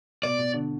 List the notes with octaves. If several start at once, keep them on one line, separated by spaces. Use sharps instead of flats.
B2 D5
B2
D3